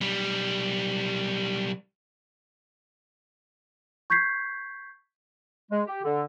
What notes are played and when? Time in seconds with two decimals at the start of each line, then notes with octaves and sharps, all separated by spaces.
0.01 B1 G3
4.10 C#6 G6 G#6 B6 C7
5.70 G#3
5.87 G4
6.03 D3